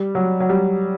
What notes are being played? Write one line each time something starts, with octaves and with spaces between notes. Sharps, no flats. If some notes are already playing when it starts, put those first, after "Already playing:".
Already playing: G3
F#3
F#3
G3